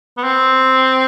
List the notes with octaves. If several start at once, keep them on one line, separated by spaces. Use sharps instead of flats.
B3
C4